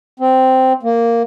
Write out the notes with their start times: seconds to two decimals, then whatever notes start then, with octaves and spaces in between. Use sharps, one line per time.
0.20 C4
0.83 A#3